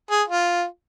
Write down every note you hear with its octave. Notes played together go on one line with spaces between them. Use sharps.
G#4
F4